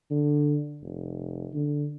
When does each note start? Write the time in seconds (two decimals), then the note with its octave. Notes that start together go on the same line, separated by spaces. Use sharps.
0.11 D3
0.82 F1
1.54 D3